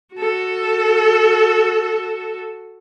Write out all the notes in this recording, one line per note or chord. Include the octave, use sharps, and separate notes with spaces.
F#4 A4